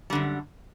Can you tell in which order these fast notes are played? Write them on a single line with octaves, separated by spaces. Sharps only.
G3 D3 F#2